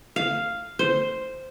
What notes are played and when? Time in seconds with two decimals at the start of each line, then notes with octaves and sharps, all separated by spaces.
0.16 F5
0.79 C5